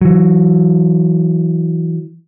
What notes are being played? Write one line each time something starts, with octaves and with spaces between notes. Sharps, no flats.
E3 F#3